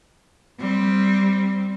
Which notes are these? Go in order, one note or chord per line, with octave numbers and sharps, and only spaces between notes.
G3 C4